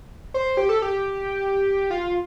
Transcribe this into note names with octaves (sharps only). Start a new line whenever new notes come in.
C5
G4
A4
G4
F4